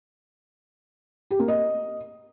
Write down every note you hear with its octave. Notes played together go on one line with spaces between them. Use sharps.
G4
A#3
D#5